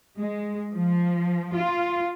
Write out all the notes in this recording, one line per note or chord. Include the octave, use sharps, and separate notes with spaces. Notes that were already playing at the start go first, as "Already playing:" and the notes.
G#3
F3
F4